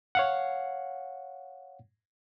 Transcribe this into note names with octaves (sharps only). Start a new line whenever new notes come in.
C#5 F5 F#5